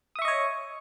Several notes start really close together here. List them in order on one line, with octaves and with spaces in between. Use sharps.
D#6 E5 C#6 D#5 C#5